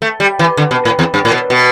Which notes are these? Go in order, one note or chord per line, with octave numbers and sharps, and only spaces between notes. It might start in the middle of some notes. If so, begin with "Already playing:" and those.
A3
G3
E3
D3
B2
A2
E2
G2
A2
B2
B2